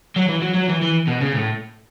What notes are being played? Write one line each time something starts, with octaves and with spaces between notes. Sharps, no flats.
F#3
E3
F#3
F#3
E3
E3
B2
C#3
A2